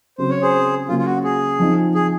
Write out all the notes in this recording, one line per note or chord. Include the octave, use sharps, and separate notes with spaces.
C#3 F#3 C4 C5
C#5
G#4 C5
C#3 F#3 A#3 F4
F4
F#4
G#4
F3 C4 D#4
G#4